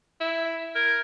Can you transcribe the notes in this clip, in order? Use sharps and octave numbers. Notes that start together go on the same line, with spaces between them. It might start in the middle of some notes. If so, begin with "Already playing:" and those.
E4
A#4 G#6